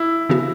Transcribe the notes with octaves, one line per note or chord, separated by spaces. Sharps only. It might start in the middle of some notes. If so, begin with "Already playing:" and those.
Already playing: E4
C#3 E3 B3 F#4